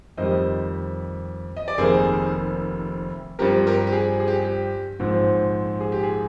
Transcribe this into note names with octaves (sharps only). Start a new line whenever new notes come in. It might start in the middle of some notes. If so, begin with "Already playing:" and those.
F2 D#3 G3 C5 D#5
D#5
D5
F1 F2 D#3 A#3 G#4 C5
G2 F3 C4 G4 A#4
G4 A#4
G4
G#4
G#4
G4
G4
A#1 G#2 F3 C4
G#4
G4
G#4